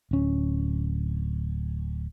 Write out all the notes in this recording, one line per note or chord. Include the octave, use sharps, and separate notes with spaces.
D1 C#4